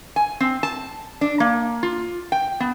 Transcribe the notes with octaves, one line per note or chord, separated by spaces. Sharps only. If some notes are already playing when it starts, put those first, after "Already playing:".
G#5
C4
A5
D4
A#3
F4
G5
B3